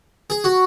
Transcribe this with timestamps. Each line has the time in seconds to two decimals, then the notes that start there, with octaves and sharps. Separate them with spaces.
0.30 G#4
0.44 F#4